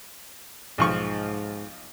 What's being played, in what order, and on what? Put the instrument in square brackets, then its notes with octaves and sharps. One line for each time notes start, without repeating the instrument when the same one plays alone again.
[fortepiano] B1 F3 C#6 [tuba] G#2